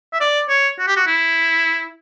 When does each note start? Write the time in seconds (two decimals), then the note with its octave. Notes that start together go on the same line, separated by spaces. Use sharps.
0.13 E5
0.20 D5
0.49 C#5
0.79 F#4
0.87 G4
0.96 F#4
1.07 E4